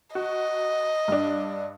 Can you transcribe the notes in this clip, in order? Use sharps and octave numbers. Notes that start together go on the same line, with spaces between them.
F#4 D#5
G2 D4